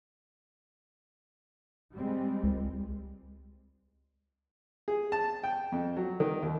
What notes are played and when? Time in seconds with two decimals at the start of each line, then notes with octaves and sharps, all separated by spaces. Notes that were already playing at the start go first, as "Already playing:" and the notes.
1.94 G3 G#3 C4
2.43 C#2
4.88 G#4
5.12 A5
5.44 G5
5.72 F2
5.97 F#3
6.20 D#3
6.43 D#2